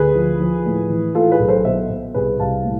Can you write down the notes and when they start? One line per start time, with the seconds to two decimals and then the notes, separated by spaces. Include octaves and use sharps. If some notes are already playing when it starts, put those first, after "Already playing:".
Already playing: D2 G#4 B4
0.15 F3
0.40 F3
0.66 A2
0.90 E3
1.15 A2 F4 A4
1.32 G#4 B4
1.40 B1
1.48 A4 C5
1.65 B2 C5 E5
1.90 B2
2.14 C2 G#4 B4
2.39 C2 F5 A5
2.64 A2